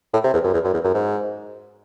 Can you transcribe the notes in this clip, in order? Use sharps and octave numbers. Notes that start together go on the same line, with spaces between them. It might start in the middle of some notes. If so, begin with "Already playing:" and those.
A2
C3
E2
F#2
E2
F#2
E2
F#2
G#2